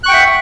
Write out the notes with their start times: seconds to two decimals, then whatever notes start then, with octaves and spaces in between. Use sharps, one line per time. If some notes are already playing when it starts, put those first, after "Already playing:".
0.03 F#6
0.06 C#6
0.08 G5
0.11 F#5
0.13 E5